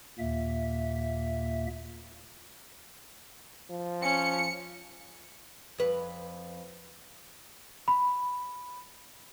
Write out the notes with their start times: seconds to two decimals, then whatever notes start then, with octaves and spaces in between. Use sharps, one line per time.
0.19 D#2 A#2 A#3 E5
3.71 F3
4.02 C#4 C#7
5.78 F2 B4
7.88 B5